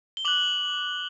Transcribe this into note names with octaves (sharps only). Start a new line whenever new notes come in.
G7
D6 F#6 F#7